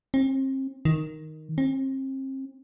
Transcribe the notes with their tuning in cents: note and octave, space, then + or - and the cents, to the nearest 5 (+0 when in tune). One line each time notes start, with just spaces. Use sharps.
C4 +35
D#3 +0
C4 +35